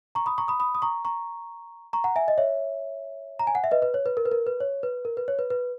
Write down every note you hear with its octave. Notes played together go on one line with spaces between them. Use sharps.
A#5 C#6
B5 D#6
A#5 C#6
B5 D#6
B5 D#6
D#6
A#5 C#6
A#5 C#6
A#5 C#6
F#5 A#5
E5 G#5
D#5
C#5 E5
A#5
G#5
F#5
E5
B4 D#5
B4
C#5
B4
A#4
B4
A#4
B4
C#5
B4
A#4
B4
C#5
B4
B4